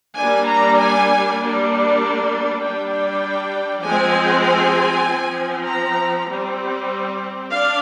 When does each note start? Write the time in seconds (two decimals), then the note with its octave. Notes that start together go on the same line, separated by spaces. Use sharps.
0.17 G3 A#3 D4 G#5
0.47 A#5
0.78 G#5
1.40 G3 A#3 D4
2.61 G3 D4 G5
2.92 G5
3.83 F3 G#3 C4 G#5
4.45 G#5
5.06 F3 C4
5.67 A#5
6.28 G3 C4
7.50 D4 F5